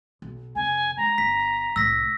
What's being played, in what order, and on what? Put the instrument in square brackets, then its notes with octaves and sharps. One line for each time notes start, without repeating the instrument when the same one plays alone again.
[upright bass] B1
[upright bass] F2 C3 [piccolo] G#5
[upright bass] G#3 [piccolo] A#5
[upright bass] G1 [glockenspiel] B6
[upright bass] C2 A2 [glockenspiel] E6 A#6 B6